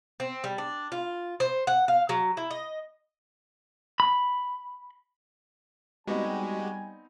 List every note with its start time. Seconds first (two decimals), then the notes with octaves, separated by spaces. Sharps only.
0.20 C4
0.44 G3
0.58 D4
0.92 F4
1.40 C5
1.67 F#5
1.88 F5
2.09 F#3
2.37 E4
2.51 D#5
4.00 B5
6.07 G3 G#3 B3 C4 D#4 F#4 G4 G#5